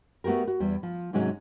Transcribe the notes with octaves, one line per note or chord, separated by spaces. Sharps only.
A3 B3 F#4 G4 A#4
F#4
E2 G3
F3
G#2 C3 F#3 G#3 C#4